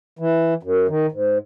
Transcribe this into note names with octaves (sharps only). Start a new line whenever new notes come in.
E3
F#2
D#3
G#2